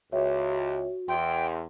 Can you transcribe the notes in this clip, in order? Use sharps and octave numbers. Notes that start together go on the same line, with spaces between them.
C#2 F#4 C#5 E5 G5
E2 G5 C6